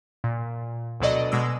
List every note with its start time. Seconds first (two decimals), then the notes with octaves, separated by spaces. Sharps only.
0.24 A#2
1.00 D2 B2 F#3 A4 D5 D#5
1.32 B2 G#3 D6 E6